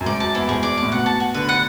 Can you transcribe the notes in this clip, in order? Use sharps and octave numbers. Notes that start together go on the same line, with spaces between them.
F#2
G#2 D5
F#2 A5
E2 E4
G#2 G#4
D5
A5
A2
B2 F#5
A5
F#4
D3 B4
F#5